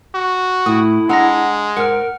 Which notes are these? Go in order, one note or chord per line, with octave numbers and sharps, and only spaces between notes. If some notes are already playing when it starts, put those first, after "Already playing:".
F#4
A2 E4 D#6
G#3 D4 F#5 A#5 A#6
G#2 A#4 F#5 F6